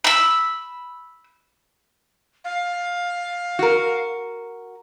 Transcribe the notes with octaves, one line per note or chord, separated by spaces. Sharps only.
B5 E6
F5
F#4 A#4